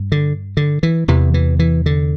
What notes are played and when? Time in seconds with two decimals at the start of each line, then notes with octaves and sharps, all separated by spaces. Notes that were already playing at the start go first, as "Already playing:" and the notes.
Already playing: G2
0.12 D3
0.57 D3
0.83 E3
1.08 E2 C3 E3
1.34 E3
1.59 E3
1.86 D3